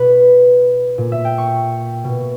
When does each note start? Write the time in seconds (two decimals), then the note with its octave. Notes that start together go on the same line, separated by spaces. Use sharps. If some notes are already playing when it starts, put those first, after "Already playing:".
Already playing: B2 B4
0.98 A#2
1.12 E5
1.25 G5
1.38 C#6
2.04 B2